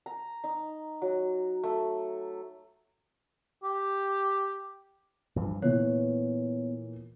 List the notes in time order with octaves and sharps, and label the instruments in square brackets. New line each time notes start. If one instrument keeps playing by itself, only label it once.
[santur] A#5
D#4
F#3
A3
[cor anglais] G4
[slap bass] G2 E3 F3
[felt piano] A#2 E3 A#3 [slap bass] B3 [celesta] C#5